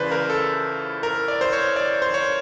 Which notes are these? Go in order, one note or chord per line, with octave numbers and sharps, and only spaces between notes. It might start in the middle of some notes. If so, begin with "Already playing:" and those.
Already playing: C#2 C#3 E3 B4 C5 D5
A#4
A4
A#4
D5
C5
C#5
D5
C5
C#5